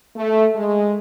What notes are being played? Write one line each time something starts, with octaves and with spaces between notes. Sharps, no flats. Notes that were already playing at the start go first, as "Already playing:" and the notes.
A3
G#3